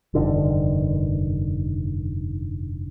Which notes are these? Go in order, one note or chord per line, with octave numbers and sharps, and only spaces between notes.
F1 G2 D3 D#3